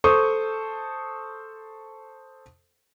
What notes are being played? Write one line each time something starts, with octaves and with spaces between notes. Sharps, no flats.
A4 C5 C#6 D#6